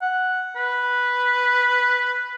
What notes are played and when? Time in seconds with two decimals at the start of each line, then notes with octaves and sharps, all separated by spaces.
0.02 F#5
0.56 B4